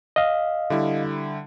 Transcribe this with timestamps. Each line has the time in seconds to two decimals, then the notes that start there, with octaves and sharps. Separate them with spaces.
0.16 D#5 F5
0.70 D3 G3 E4